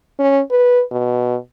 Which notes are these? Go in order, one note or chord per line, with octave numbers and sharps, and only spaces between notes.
C#4
B4
B2